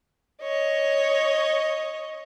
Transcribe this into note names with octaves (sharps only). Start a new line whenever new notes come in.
C#5 D#5